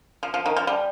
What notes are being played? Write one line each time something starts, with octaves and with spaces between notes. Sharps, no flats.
F3
F3
D#3
F3
G3